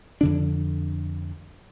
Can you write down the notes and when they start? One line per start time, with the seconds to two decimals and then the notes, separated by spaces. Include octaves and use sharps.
0.21 F2 D3 D4